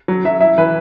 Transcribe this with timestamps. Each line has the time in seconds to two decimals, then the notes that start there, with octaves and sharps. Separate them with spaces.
0.08 F#3
0.25 F#3 E5
0.40 E4 E5
0.58 E3 B4